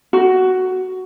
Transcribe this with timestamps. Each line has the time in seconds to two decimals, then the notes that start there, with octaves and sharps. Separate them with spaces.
0.13 F#4